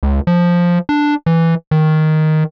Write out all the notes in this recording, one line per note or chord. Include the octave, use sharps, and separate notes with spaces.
C#2
F3
D4
E3
D#3